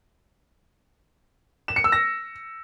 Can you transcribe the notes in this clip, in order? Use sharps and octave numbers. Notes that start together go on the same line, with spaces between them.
E7
C#7
E6
A#6